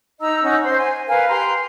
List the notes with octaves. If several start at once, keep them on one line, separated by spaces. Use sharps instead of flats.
D#4 D#5 A#5 E6
C#4 D#4 F#5
C5 C6
G#5
A#4 B4 F5 G#5
G4 A#5 C6